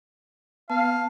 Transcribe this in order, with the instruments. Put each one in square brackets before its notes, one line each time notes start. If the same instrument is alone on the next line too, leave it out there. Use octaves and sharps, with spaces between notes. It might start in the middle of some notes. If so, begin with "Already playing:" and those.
[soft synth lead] B3 [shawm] F5 [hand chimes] A5